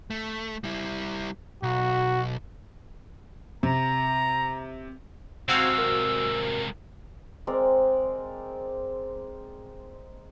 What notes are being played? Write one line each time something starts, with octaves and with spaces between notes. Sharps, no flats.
A3
G3 E4
B1 F#4
C3 A#5
C3 G#3 C4 F#4 F5 E6 G#6
A#4
G#3 C4 A#4 D5